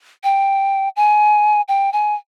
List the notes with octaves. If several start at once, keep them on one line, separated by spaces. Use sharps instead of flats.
G5
G#5
G5
G#5